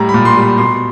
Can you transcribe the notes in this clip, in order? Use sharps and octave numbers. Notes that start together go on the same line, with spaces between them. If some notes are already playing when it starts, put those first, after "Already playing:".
Already playing: A2 G3 A#5
B5
A#2
C6
G3
B5
B2 C6